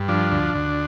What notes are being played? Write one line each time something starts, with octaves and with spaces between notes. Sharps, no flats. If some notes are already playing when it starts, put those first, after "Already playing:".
Already playing: G2
F3 D4
D2
D2